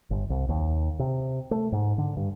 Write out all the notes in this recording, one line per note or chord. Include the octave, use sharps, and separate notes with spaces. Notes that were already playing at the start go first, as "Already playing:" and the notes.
G1
C2
D#2
C3
A3
G#2
D3
G2